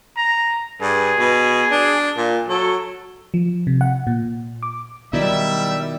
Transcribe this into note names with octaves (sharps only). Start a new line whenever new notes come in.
A#5
G2 G#4
B2
D4
A#2
F#3 A4
F3
C3
F#5
A#2
D6
B2 D#3 F#3 G3 D#4 E4 D5 E5